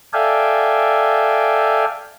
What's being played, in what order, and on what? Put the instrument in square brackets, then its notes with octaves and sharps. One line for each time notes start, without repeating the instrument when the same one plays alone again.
[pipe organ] A4 D5 E5 F5 G5 G#5